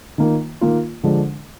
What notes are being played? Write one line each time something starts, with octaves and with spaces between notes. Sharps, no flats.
D#3 A#3 F4
D#3 A#3 F4
D3 F3 G#3 D4